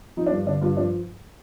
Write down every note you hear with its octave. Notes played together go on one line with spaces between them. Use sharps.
F3 D#4
D4
G2
D3 D4
G2 F4
F3 D4